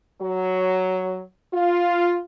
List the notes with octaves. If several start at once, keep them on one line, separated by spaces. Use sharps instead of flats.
F#3
F4